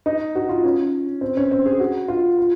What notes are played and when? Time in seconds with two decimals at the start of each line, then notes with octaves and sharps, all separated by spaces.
0.06 D#4
0.35 F#4
0.49 F4
0.64 C#4
1.21 C4
1.37 C#4
1.51 C4
1.66 G#4
1.80 F#4
2.08 F4
2.38 F4